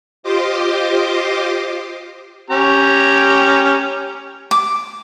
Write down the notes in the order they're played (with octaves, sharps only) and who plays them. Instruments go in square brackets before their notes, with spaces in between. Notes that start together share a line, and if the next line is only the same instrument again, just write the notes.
[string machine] F4 G4 C5 D#5 C6 D6
[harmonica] C#4 G4 A#5
[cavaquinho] D6